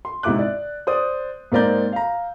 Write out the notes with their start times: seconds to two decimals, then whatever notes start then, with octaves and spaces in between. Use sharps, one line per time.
0.05 C6
0.23 G#2 C3 E4 D6 F#6
0.38 D5
0.87 C5 D5 D#6
1.52 G#2 A#3 C4 D5 A#5 G6
1.92 F5 A#5